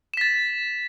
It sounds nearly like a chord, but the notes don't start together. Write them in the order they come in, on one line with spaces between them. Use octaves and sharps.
E7 B6 A6